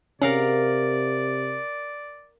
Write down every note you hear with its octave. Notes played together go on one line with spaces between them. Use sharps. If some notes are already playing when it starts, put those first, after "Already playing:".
C3 C#4 A#4 D5 F5 F#5